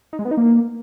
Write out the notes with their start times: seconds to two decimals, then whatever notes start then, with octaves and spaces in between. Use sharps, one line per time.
0.13 D#4
0.19 G#3
0.25 B3
0.31 D#4
0.37 A#3